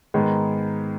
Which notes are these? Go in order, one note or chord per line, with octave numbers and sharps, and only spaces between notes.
G#2 D#3 G#3 B3